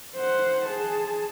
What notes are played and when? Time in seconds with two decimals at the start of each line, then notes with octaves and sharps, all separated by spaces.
0.16 C5 F#5
0.65 G#4 A5